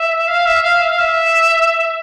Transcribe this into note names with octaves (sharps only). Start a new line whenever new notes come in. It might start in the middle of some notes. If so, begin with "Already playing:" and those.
Already playing: E5
F5
E5
F5
E5
F5
E5